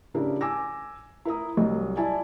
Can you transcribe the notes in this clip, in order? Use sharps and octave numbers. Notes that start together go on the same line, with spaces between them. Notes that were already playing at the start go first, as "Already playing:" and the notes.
C#3 D4 E4 G4 A#4
G#5 D6 E6 A#6
E4 A#4 A#5 D#6
C2 F#3 D#5
E4 D5 G#5 A5